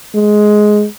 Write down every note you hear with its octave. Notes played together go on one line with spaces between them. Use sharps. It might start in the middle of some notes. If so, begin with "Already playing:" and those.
G#3